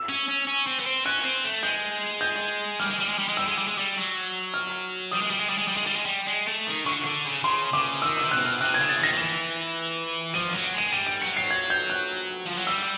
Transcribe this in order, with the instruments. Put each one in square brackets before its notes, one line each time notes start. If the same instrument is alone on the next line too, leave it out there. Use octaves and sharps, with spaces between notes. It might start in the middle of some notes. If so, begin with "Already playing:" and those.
Already playing: [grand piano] E6
[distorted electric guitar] C#4
C#4
C#4
C4
B3
C4
[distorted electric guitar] C#4 [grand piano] F#6
[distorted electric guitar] C4
A3
[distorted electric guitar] G#3 [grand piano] G6
[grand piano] G6
[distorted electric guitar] G3 [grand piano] F6
[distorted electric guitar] G#3
G3
G#3
G3
G#3
[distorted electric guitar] G3 [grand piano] E6
[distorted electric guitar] G#3
G3
G#3
G3
F#3
[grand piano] F6
[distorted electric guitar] G3 [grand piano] D#6
[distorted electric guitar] G#3
G3
G#3
G3
G#3
G3
G#3
G3
G#3
G3
G#3
A3
D#3
[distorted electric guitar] D3 [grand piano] C#6
[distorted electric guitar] D3
C#3
[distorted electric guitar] C#3 [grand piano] C6
[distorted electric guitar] C#3 [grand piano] D6
[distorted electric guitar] D#3 [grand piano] E6
[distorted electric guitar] C3 [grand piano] E6
[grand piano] F#6
[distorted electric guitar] C3
[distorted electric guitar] B2 [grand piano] F6
[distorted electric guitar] C3 [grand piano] F#6
[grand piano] G#6
[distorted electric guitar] C#3
[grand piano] A6
[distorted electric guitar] D#3 [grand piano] A#6
[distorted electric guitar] D#3
[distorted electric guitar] E3 [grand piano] E7
[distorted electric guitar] F3 [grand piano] D#7
[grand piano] D#7
[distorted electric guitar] F#3
[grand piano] D7
[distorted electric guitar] G#3 [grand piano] D#7
[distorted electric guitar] G3 [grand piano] D#7
[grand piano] D7
[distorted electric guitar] F#3 [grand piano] C#7
[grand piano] C7
G#6
G6
F#6
[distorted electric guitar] F3
F#3
[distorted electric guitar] G3 [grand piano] E6